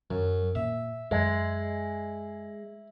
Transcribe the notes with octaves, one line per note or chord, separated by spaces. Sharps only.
F#2 F#3
A#2 E5
F#2 G#3 E4